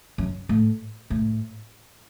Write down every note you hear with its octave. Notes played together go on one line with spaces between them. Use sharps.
F#2
A2
A2